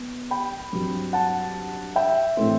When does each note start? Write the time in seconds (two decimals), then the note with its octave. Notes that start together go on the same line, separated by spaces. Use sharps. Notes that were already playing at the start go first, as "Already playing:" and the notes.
Already playing: B3
0.31 G5 B5
0.73 G2 F#3 C4
1.13 F#5 A5
1.96 E5 G5
2.37 A2 E3 A3 C4